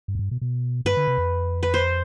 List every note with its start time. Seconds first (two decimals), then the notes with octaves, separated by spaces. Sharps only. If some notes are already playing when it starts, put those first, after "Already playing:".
0.08 G2
0.15 F2
0.19 G2
0.31 B2
0.41 B2
0.85 G2 B4
0.97 D3
1.08 C3
1.18 F2
1.63 B4
1.74 C5